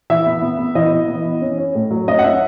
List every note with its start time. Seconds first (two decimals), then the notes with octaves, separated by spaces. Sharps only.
0.10 E3 E5
0.26 B3
0.42 B3
0.59 B3
0.75 E3 D#5
0.92 E3
1.08 B3
1.25 E3
1.41 C#4
1.58 C#4
1.75 A2
1.91 F#3
2.07 C#4 D#5
2.19 F#5
2.24 C#4 E5